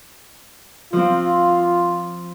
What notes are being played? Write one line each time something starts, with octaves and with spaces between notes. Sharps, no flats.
F3 C4 F4